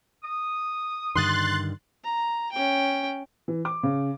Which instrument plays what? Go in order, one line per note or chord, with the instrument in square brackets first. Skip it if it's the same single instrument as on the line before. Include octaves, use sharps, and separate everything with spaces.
[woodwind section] D#6
[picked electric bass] G2 D3 D#3 [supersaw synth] C6 F#6 A6
[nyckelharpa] A#5
C#4 G5
[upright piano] E3
D6
C#3